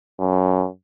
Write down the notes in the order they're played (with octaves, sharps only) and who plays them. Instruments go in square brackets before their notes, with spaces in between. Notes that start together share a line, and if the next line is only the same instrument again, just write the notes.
[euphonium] F#2